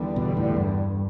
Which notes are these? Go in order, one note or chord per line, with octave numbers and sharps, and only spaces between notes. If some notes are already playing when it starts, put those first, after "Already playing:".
Already playing: E2 D3 G3 B3
B2
A2
G2